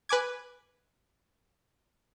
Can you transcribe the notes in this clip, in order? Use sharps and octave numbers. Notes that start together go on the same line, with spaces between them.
B4 G#5 D6 G#6